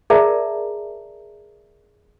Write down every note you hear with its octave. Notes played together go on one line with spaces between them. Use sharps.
G#4 A#4 D5 E5 A5 A#5